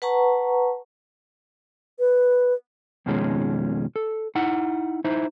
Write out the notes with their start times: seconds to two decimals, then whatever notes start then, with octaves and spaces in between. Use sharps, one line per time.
0.02 B4 F#5 A5 A#5 C#6
1.99 B4
3.06 F2 B2 D#3 F3 G#3 C#4
3.96 A4
4.35 D#4 E4 F#5
5.04 D#4 E4 C5